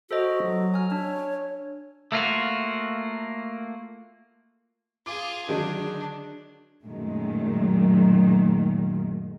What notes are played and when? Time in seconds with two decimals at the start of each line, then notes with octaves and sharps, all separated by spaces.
0.11 F#4 A4 C5 D#5
0.42 F#3
0.74 G#5 F6
0.92 D4 C#5
2.12 A3 A#3 F4 F#4
5.06 F4 G#4 D6
5.49 D3 D#3 F#3 G#3 D4
6.83 F#2 A#2 D#3 F#3 G#3 A3